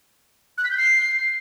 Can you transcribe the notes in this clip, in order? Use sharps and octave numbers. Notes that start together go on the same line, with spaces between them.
F#6
B6
G6
C7